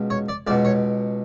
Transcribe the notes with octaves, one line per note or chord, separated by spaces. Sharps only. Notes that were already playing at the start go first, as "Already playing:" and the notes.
Already playing: C#2 B2
C#5
D5
C#2 B2 D5
C#5